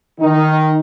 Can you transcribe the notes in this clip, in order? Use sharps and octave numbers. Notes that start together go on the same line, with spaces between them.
D#3 D#4